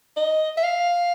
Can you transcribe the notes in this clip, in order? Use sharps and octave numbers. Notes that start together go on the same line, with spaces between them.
D#5
E5
F5